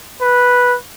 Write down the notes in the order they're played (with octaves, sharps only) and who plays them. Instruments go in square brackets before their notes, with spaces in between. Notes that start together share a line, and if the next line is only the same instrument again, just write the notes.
[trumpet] B4